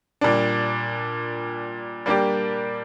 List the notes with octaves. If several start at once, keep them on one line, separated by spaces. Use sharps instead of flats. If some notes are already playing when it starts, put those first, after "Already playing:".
A#2 G3 D4
G3 A#3 D4 G4